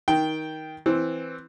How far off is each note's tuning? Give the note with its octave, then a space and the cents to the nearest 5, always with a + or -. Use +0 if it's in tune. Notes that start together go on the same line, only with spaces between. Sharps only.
D#3 +15 G5 +0
E3 +0 C4 +0